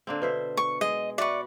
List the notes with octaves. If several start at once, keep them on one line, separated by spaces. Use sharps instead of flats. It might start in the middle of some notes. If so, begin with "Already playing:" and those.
D3 A#3 C4
B2 B4 C5 E5
C#6
G#3 D#5
F#4 B4 D5 E5 C#6